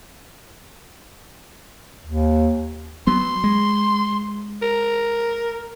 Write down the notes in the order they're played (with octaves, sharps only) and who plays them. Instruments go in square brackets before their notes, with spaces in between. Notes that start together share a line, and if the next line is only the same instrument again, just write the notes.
[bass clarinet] D#2
[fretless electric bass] F#3 B3 [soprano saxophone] C6
[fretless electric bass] G#3
[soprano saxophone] A#4